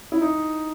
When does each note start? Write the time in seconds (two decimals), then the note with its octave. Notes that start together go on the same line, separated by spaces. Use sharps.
0.12 E4
0.21 D#4